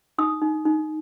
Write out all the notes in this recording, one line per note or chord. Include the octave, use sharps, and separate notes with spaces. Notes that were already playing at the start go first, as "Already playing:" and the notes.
D#4 D#6
D#4
D#4